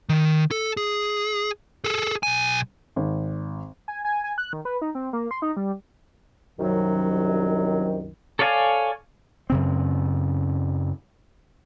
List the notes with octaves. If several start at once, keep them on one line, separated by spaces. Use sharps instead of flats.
D#3
A4
G#4
G#4 A4
B1 G#5
G#1
G#5
G#5
G#5
F#6
D#3
B4
D#4
C4
A#3
C6
D#4
G3
C2 F#2 D#3 F#3
A4 C#5 D5 F5 G#5
F#2 C#3 C4